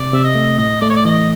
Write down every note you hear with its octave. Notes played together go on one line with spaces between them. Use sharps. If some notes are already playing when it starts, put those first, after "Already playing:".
Already playing: C3 D5
C3 E5
D#5
A3
A2 D#5
A3 D5
C#5
D5
E3 D#5